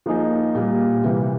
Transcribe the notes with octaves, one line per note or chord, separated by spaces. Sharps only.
F3 A#3 D#4 G#4
A#2 G3 A#3
C3 E3 G3